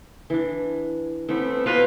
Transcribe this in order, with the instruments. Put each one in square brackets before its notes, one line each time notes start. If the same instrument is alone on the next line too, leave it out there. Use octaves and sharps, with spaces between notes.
[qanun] E3 D4
[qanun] E3 [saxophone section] A3 B3 C4
[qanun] B2 A5 A#5 [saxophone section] F4 B4